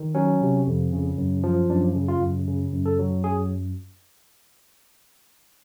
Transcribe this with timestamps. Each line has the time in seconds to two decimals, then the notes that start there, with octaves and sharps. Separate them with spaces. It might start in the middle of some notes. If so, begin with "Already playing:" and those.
Already playing: D#3
0.15 F#3 C#4
0.41 C3
0.67 F2
0.93 C#3
1.18 F#2
1.43 F3
1.69 F#2 D4
1.95 C#3
2.08 F4
2.21 F#2
2.47 C#3
2.73 F#2
2.86 A4
2.99 F#3
3.24 F#2 G#4